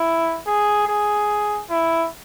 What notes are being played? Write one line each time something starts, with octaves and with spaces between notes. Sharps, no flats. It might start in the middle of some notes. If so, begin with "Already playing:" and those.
Already playing: E4
G#4
G#4
E4